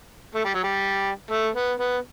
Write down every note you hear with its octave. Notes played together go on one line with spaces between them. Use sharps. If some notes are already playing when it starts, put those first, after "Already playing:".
A3
G3
F#3
G3
A3
B3
B3